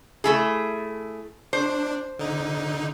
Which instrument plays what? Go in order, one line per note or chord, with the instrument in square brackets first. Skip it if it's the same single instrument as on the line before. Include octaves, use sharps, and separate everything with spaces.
[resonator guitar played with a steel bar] A3 E4 G#4
[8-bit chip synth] D4 [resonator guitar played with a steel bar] C5
[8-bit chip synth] D3 D#4